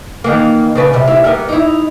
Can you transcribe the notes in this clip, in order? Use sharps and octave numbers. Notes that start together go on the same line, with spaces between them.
D#3 E3 A#3
C#3 D4 B4
C3 G3
E4 G4
G3 A#3 B3
D#4 E4